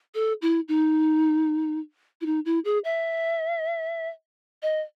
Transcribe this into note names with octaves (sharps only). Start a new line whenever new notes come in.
A4
E4
D#4
E4
D#4
E4
G#4
E5
D#5